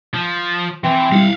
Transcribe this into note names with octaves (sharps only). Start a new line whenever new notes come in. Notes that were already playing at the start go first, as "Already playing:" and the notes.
F3
E3 C4
G3 E4 F5 F#5